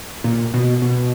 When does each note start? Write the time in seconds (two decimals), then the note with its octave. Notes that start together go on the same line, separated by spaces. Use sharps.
0.24 A#2
0.54 B2
0.82 B2